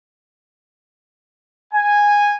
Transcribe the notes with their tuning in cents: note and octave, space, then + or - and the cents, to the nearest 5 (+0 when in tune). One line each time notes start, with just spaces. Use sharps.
G#5 -10